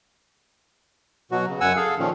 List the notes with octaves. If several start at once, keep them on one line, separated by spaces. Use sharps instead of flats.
B2 F#3 F#4
C#3
F#2 F#5 G#5 E6
G#4 A4 F5
A#2 D#3 F3 C#4